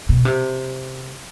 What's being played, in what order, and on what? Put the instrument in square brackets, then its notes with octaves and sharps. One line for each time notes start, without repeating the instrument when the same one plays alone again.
[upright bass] B2
C3